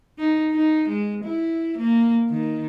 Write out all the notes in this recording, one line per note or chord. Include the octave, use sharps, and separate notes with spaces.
D#4
D#4
G#3
E4
A#3
D#3